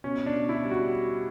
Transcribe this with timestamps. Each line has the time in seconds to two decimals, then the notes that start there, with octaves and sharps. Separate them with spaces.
0.04 B2 C#4
0.26 D4
0.33 B2
0.49 E4
0.64 G3
0.71 F#4